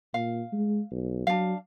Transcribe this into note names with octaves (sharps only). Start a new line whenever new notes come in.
A#2 F5
G#3
B1
F#3 D4 F5